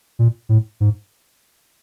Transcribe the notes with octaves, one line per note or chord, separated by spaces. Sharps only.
A#2
A2
G#2